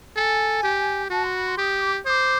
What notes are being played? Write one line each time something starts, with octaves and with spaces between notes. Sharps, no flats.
A4 G#5
G4
F#4 A5
C6
B5
C6
G4 D#6
D#6
D6
C5 D6 D#6